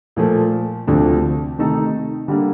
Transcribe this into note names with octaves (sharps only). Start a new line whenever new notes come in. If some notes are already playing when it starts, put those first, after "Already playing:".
A#2 F3 A3
D2 C3 F3 A3 D4
C3 D#3 A3 D#4 A4
D3 G3 A#3